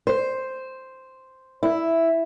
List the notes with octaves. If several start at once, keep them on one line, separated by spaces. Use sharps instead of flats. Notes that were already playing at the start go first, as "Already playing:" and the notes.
C5
E4